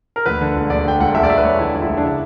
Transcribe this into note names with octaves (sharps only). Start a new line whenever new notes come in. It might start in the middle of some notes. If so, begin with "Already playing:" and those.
A#4
D2 B4
D3
E1
D2 D5
D3 G5
E1 F#5
E1 E5
D5
E1 E5
B4
E1 C#5
D3 E4
E1
E4
E1
D4
C#3 E4